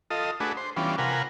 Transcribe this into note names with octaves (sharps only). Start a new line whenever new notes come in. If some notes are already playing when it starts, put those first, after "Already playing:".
F4 A4 D#5
A3 D4 F#4 G#4 B4
C5
E3 G3 B3 C#4 D4 F4
C3 F4 A#4 B4 F#5 G#5